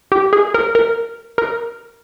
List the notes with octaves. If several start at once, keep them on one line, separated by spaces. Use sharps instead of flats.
G4
G#4
A#4
A#4
A#4